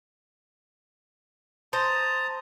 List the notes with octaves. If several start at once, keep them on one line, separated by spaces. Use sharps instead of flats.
C5 A5 A#5 D#6